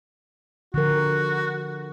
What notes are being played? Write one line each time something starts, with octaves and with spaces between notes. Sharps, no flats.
D3 F3 F#4 A#4